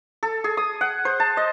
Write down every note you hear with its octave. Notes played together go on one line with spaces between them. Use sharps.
A4
G#4
D#6
F#5
C5
A5
D#5